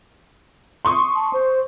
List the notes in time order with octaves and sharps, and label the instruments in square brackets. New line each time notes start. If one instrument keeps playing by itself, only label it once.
[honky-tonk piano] C6 C#6 D#6
[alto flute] A5
C5